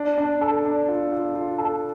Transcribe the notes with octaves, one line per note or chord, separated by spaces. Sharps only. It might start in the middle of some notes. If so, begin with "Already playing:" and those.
Already playing: D4
D4
A4
D4
F4
F4
F4
A4